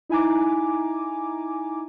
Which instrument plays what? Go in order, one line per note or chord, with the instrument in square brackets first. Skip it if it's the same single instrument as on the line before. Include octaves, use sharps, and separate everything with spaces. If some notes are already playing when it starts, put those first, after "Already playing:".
[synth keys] D#4 E4 G#5 A#5 D6